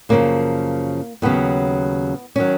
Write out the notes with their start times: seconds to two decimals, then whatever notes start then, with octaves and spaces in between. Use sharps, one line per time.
0.09 F#2 C#3 F3 A#3
1.22 D#2 C#3 F#3 B3
2.36 D#3 F#3 C#4